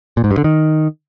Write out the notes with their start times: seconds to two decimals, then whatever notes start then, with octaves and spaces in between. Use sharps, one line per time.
0.17 A#2
0.24 G#2
0.31 G2
0.38 D3
0.44 D#3